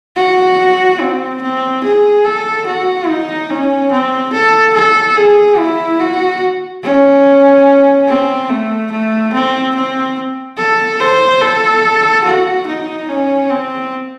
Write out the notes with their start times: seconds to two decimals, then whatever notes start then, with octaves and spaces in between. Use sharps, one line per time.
0.16 F#4
1.01 C4
1.42 C4
1.84 G#4
2.25 A4
2.67 F#4
3.08 D#4
3.50 C#4
3.91 C4
4.33 A4
4.74 A4
5.17 G#4
5.58 E4
6.00 F#4
6.83 C#4
8.08 C4
8.49 A3
8.91 A3
9.33 C4
9.75 C4
10.57 A4
11.00 C5
11.41 A4
12.24 F#4
12.67 D#4
13.08 C#4
13.50 C4